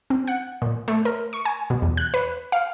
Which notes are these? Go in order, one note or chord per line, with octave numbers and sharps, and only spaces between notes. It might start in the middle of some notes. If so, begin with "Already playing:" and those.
C4
F#5
A#2
A3
A#4
C#6
G#5
B2
E2
F#6
B4
F5